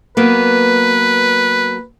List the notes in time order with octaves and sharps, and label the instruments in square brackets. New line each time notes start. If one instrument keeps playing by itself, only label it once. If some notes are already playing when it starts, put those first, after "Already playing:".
[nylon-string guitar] F#3 A#3 B3 [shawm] B4